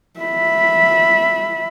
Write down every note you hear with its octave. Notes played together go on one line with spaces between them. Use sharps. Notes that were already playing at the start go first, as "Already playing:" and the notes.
E5 B5